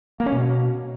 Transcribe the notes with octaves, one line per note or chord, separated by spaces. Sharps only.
A#3
C#4
B2